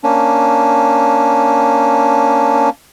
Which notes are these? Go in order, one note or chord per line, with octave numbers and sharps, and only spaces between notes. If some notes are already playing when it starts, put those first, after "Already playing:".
A#3 C#4 D4